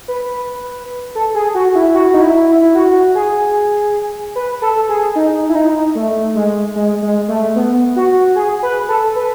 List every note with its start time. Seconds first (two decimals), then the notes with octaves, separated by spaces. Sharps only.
0.08 B4
1.15 A4
1.35 G#4
1.55 F#4
1.75 E4
1.95 F#4
2.14 D#4
2.21 E4
2.48 E4
2.75 F#4
3.15 G#4
4.35 B4
4.62 A4
4.89 G#4
5.15 D#4
5.49 E4
5.55 D#4
5.95 A3
6.35 G#3
6.76 G#3
7.02 G#3
7.28 A3
7.56 B3
7.96 F#4
8.36 G#4
8.63 B4
8.89 A4
9.16 B4